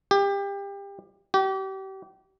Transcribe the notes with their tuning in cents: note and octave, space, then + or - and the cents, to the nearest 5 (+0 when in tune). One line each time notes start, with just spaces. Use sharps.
G4 +25
G4 -35